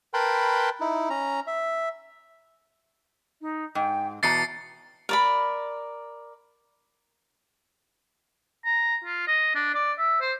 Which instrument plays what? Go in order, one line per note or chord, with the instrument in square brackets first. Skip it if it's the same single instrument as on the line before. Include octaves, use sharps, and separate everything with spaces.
[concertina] A#4 B4 G5 A5 B5 C6
D#4 E4
C#4 A#5
E5
[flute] D#4
[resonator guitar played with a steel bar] G#2 [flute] G5
[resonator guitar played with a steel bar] E2 B2 A#5 [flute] A5 [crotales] A6 C7 C#7
[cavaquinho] A#4 D5 B5
[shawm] A#5
F4
D#5
D4
D5
E5
C5